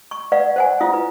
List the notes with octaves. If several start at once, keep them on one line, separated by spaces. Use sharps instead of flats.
C#6
B4 D5 F5 F#5
C5 F#5 G#5
E4 F4 F5 D#6
B4